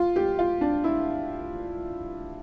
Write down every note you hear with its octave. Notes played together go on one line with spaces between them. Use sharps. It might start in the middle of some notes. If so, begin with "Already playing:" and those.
Already playing: F4
G4
F4
D4
E4